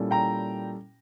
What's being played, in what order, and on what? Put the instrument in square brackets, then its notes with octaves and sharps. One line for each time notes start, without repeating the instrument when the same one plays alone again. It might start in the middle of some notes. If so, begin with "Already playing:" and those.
Already playing: [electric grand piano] A#2 G3 C#4 E4 A4
[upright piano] G5 A#5